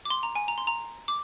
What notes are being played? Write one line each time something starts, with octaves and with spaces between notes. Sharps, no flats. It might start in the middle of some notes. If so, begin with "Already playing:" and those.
D6
C6
A#5
G#5
A#5
C6
A#5
D6